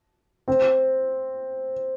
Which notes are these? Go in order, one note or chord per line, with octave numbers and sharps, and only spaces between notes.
C4